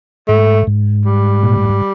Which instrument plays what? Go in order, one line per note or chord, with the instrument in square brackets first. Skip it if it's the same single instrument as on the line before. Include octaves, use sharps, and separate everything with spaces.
[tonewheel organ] G#2 [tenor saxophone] A3
[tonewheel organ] G#2
[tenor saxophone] G3
[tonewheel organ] A#2
A2
G#2